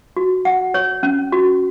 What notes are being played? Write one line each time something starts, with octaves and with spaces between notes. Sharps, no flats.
F#4
F#5
C#5
C#4
F#4